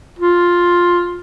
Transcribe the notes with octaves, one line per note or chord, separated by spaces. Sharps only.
F4